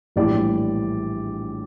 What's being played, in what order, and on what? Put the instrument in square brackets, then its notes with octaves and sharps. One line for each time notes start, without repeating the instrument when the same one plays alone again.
[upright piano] A#1 A2 E3 G3 D5